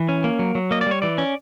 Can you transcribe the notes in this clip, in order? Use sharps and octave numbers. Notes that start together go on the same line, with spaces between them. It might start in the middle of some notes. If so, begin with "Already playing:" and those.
Already playing: E3
C#4
A#3
F#3
F#3
A#3 D#5
D5
G3 C#5
E3 D5
C#4